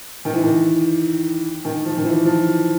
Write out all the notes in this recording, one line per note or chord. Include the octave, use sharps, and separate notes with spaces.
D#3
E3
D#3
D#3
F3
D#3
E3
F3